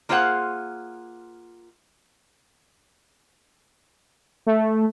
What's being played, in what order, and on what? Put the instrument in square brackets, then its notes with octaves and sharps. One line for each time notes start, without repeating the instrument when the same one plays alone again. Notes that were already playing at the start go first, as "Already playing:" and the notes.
[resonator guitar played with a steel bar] A#3 F4 G#4 C5 F5 F#5
[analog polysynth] A3